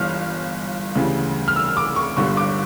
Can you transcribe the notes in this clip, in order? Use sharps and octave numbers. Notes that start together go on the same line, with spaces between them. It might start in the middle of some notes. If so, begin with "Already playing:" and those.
Already playing: G1 G2 E3 F6
D2 C#3 E3 G3
F6
E6
D6
C#6
G1 G2 D3 G3 C#6
D6